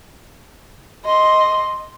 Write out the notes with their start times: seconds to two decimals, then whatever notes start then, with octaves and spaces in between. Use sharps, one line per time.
1.05 D#5 C6